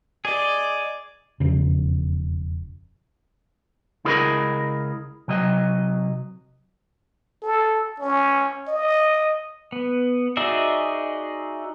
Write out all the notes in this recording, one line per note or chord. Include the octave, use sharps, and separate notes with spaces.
G#4 D5 D#5
E1 F2 C#3
C#2 E4 G#4 A#4 D#5 B5
C3 F#3 D#5
A4
C#4
D#5
B3
D#4 F#4 G#4 D5 E5